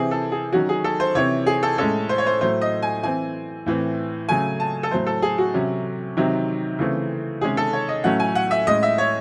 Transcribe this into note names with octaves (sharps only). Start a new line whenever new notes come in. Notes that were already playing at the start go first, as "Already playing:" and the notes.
Already playing: C3 E3 C4 G#4
A4
G#4
D#3 F#3 C#4 F#4
G#4
A4
C5
C3 E3 C4 C#5
G#4
A4
A2 G#3 C#4 A4
C5
C#5
C5
A2 F#3 A3 C5
D#5
G#5
E3 C4 G#5
A2 E3 C4
C#3 F#3 A3 G#5
A5
A4
A2 F#3 A3 C5
A4
G#4
F#4
C3 F#3 C#4
C3 D#3 F#3 C4
C#3 E3 A3 C4
C3 D#3 G#3 C#4 G#4
A4
C#5
D#5
A2 F#3 A3 C#4 F#5
G#5
F#5
E5
A2 G#3 C#4 D#5
E5
C#5